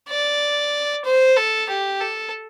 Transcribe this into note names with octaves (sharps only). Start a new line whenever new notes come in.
D5
C5
A4
G4
A4